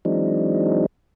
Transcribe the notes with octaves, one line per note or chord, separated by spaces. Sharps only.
E3 F#3 G#3 C4 D4 D#4